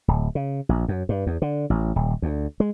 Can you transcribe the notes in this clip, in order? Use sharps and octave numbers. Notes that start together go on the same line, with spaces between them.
D1
C#3
A#1
F#2
G2
E2
D3
A1
D#1
D2
G#3